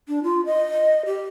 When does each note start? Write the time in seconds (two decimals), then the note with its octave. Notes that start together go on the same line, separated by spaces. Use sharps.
0.08 D4
0.23 F4
0.46 D#5
1.06 G4